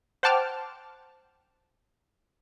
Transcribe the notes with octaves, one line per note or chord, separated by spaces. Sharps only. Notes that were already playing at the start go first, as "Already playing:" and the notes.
C5 F#5 G5 A5 D6 F6